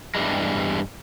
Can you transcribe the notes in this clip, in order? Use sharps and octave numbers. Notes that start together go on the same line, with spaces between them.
E2 G2 E3 G3 G#3